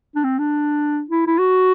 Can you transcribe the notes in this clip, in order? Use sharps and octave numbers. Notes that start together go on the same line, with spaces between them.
D4
C4
D4
E4
E4
F#4